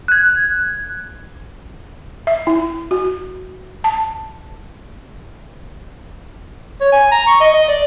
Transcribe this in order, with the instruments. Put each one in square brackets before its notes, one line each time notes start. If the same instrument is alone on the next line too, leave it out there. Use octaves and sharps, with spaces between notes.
[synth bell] F#6 G#6
[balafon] E5
E4
F#4
A5
[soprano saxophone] C#5
G#5
A#5
C#6
D#5
D#5
D5